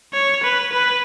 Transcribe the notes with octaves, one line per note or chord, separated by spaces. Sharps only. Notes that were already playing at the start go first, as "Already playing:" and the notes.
C#5
B4
B4